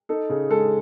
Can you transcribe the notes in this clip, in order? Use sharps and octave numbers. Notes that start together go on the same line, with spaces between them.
D#4 A4
C#3
G#3 A4